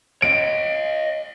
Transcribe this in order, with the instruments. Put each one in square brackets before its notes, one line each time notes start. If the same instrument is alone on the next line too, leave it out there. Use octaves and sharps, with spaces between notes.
[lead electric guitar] C#5 D#5 [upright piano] D7